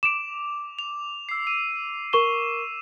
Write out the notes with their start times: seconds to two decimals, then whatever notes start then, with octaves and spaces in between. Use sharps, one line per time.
0.03 D6 D7 E7 F7
0.79 F7
1.29 E6 C7
1.47 E6 D#7
2.13 A#4 C#6 E7 G7